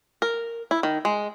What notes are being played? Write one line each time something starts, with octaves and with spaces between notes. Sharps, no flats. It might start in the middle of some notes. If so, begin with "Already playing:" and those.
A#4
E4
D#3
G#3